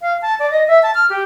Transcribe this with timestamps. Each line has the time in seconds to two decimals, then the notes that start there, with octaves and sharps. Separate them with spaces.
0.01 F5
0.22 A5
0.39 D5
0.51 D#5
0.68 E5
0.83 A5
0.95 F6
1.10 G4